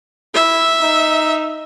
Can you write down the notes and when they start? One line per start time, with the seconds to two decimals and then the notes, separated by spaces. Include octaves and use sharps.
0.34 E4 E5
0.81 D#4